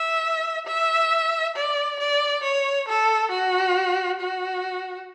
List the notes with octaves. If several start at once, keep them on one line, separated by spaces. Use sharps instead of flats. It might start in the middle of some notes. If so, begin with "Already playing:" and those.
Already playing: E5
E5
D5
D5
C#5
A4
F#4
F#4